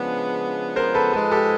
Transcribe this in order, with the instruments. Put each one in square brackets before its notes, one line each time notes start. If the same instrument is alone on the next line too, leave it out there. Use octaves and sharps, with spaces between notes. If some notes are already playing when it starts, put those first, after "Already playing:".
Already playing: [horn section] C#3 F3 G#3 B3 D4
[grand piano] A#4 C5
A4 B4
[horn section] G#2 F3 G#3 [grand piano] A4 B4
[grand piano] G4 A4